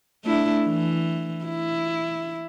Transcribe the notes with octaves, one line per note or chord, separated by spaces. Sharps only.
A3 D4 E4
E3
E4